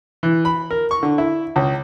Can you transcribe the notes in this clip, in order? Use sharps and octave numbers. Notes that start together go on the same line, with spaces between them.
E3
B5
A#4
C#6
D3
E4
C#2